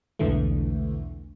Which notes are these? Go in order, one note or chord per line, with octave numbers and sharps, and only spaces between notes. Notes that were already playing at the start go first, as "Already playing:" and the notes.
B1 E2 G#2 D3 E3 A3